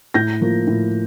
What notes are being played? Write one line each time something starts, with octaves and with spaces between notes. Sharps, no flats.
A2 G6 A#6
F3 A#3
A2